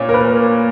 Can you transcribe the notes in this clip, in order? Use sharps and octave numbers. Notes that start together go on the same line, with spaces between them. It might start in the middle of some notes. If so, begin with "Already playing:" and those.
Already playing: A#2 C#4 C#5
A#4
B4